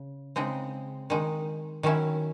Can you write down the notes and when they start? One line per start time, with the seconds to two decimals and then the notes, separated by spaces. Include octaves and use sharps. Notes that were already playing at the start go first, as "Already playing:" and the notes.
Already playing: C#3
0.36 C#3 G#3 C4 D#4
1.10 D#3 G#3 D#4
1.83 D#3 F#3 C#4 E4